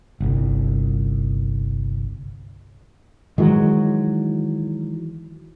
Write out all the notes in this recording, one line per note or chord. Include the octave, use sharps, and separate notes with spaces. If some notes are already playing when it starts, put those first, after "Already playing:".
G1 C2
D#3 E3 F#3 G#3